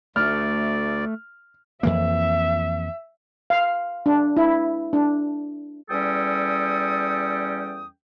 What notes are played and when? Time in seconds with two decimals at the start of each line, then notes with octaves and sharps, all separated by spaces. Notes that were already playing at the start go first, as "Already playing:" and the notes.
0.16 D2 A3 D5 F6
1.83 F2 E3 A#3 E5
3.50 F5
4.06 D4
4.37 E4
4.93 D4
5.90 E2 G3 C#4 A4 G5 D#6